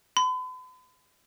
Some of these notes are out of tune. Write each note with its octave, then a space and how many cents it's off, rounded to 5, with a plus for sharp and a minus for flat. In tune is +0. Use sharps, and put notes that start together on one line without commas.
B5 +45